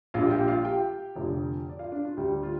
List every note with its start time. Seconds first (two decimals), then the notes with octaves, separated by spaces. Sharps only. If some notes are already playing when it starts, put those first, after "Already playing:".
0.14 A#1 A#2 G3 F4 F5
0.31 G4 G5
0.48 F4 F5
0.65 G4 G5
1.16 F1 F2 D3 F3
1.69 D5
1.79 F4 F5
1.92 D4 D5
2.05 F4
2.17 D2 D3 G3 G4
2.43 F4